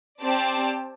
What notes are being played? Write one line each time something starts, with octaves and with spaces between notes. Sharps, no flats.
C4 G4 D5 A5